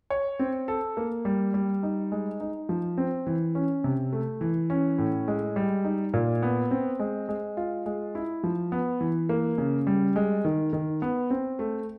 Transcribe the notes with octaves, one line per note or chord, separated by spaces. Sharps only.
C#5
C4
A4
A#3
G3
G3
D#4
G#3
D#4
F3
C4
E3
C#4
C3
A3
E3
C#4
A2
G#3
G3
D#4
A#2
B3
C4
G#3
G#3
F4
G#3
E4
F3
B3
E3
A#3
C#3
G3
G#3
D#3
D#3
B3
C4
A3